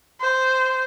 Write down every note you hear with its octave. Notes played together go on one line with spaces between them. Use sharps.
C5